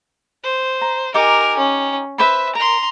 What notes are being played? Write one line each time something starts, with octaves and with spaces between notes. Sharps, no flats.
C5
A#5
D#4 G4 A#4 G#5 D6
C#4
B4 C5 E5 B5
A#4 A#5 C6